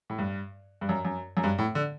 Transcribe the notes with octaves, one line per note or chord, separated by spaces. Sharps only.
A2
G2
G2
F#2
F#2
F#2
G2
A2
D3